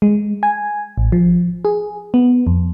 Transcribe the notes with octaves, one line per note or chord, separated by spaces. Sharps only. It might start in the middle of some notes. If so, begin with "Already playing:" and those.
G#3
G#5
A1
F3
G#4
B3
F2